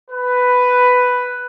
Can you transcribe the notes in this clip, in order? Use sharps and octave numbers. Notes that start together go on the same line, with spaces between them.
B4